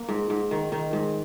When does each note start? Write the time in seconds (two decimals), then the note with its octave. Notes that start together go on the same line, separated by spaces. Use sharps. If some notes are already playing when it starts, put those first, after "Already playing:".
Already playing: A#3
0.09 G#2
0.30 G#2
0.51 D#3
0.72 D#3
0.93 G#2